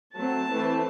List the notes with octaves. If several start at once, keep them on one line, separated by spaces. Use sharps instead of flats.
F#3 A3 C4 A5
E3 A3 C4